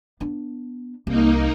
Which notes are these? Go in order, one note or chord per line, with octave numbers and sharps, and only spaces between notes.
B3 D4
C2 A#3 D#4